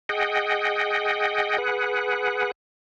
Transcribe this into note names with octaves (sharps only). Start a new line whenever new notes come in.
G#4 D#5 F#5 G5
G#4 B4 F#5